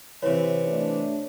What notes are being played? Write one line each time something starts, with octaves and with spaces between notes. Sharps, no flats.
C3 E3 C#5
A3 D4